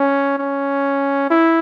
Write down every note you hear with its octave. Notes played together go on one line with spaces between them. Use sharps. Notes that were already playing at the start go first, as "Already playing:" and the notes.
Already playing: C#4
C#4
E4